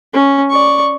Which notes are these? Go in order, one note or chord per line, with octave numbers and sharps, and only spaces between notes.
C#4
D5 C#6